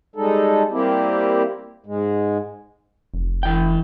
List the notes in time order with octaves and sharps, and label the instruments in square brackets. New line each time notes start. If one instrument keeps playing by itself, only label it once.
[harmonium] G3 G#3 D#4 A4
G3 A#3 C4 E4 G4
G#2 G#3
[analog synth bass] F1
[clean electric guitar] E3 G5